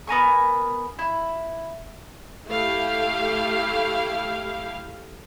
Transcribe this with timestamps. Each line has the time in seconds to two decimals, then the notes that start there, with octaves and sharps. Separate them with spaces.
0.07 B3 A#4 G#5 C#6
0.99 E4
2.48 A3 E4 G4 F5